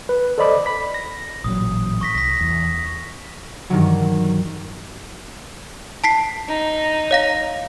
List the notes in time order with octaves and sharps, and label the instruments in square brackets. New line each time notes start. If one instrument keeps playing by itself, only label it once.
[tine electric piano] B4
A4 C5 D5 D#5 B5 D6
B5 B6
A#6
[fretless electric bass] A1 A#2 F#3 [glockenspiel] D#6
[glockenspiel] C#6 A#6 B6
[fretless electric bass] C2 [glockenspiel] A#6 B6
[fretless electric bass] E2
[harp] G2 D#3 E3 F#3
[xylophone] A5 B6 C7
[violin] D#4
[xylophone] C#5 F5 A#6